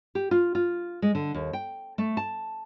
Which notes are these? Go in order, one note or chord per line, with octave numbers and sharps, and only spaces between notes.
G4
F4
F4
G#3
D3
D#2
G5
A3
A5